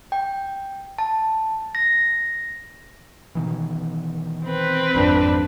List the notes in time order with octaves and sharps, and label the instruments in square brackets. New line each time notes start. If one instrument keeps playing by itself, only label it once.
[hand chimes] G5
A5
A#6
[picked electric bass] B2 D#3 E3
[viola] C4 B4
[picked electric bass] G#1 [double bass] F2 D4